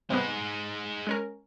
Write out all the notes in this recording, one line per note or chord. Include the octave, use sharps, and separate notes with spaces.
C3 G3 G#3 B3 D#4
G#3 C#4 A#4